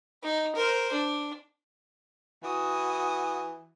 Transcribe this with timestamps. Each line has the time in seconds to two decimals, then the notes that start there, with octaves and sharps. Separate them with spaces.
0.23 D#4
0.55 A#4 C5
0.92 D4
2.43 E3 F#4 D#6